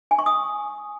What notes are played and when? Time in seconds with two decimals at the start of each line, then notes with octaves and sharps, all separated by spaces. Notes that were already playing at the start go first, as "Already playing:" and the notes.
0.11 G#5
0.19 C#6
0.26 D#6